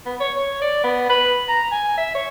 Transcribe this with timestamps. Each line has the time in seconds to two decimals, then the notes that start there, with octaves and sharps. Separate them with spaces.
0.06 B3
0.20 C#5
0.36 C#5
0.62 D5
0.84 B3
1.10 B4
1.49 A#5
1.72 G#5
1.98 E5
2.15 C#5